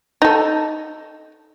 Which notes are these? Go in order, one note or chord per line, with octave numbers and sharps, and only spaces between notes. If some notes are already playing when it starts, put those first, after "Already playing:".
D#4 A4